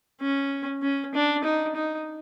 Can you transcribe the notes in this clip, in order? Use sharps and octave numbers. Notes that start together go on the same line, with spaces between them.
C#4
C#4
D4
D#4
D#4